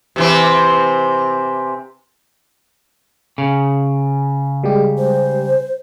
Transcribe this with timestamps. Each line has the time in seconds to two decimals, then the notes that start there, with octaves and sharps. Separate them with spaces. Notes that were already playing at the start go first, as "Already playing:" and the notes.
0.16 C3 E3 C4
3.38 C#3
4.64 G3 G#3 G4
4.98 C5